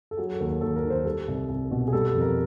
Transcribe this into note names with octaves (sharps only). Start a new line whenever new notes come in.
A4
F#3 G#4
A4
D#2
A#4
D#2 A4
A#4
D#3
C5
G3 A4
C2
C2
B2
G#4
G3 A4
A4
F2
A#4